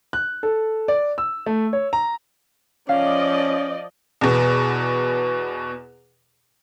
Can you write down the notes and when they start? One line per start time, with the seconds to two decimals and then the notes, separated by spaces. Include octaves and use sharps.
0.13 F#6
0.43 A4
0.88 D5
1.18 E6
1.46 A3
1.73 C#5
1.93 A#5
2.89 F3 C#4 D5 D#5 F5
4.21 E2 B2